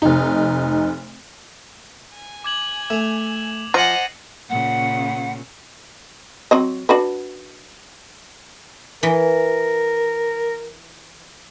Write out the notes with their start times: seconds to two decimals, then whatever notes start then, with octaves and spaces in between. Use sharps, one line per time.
0.02 F1 D#4
2.14 G#5
2.44 D6 G#6 F#7
2.90 A3 E7 F7
3.74 F3 D#5 F#5 G#5 A#5 A6 C7 D#7
4.49 A#2 C#3 F#5
6.51 F#3 C4 D#5
6.89 D4 F#4 B4
9.03 E3 A#4